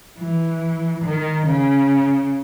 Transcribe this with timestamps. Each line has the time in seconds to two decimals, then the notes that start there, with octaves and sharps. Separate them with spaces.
0.18 E3
1.05 D#3
1.47 C#3